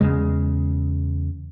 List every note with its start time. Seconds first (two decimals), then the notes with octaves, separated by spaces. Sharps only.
0.01 E2 C#3 G#3